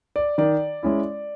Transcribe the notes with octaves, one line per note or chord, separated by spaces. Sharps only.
D5
D#3 D5
G#3 C#4 E4